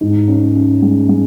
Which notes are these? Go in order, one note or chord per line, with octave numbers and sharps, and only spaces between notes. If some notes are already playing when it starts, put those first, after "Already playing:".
G#2
C#4
C#4
G#3
G#3